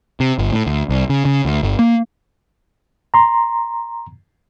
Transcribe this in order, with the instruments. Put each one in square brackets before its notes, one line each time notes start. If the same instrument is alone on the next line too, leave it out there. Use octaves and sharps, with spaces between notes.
[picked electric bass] C3
G1
A2
D2
C2
C#3
C#3
D2
G1
A#3
[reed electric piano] A#5 C6